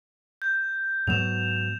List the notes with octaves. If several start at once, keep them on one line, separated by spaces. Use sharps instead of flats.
G6
G#2 F#3 B3 E7 F7